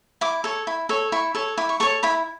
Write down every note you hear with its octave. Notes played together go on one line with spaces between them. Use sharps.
E4 D6
A4 C#5
E4
A4 C#5
E4 C#6
A4 C#5
E4 D6
C#6
A4 C#5 C#6
E4 B5